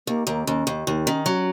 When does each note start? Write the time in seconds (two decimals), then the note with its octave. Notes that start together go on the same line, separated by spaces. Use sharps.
0.07 D#2 A#3
0.27 D#2 A#3
0.47 D#2 C#4
0.67 D#2
0.87 D#2 D#4
1.06 D#3 C#4
1.26 F#3 C#4